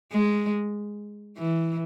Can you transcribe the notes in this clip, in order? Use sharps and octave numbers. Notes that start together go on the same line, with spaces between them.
G#3
E3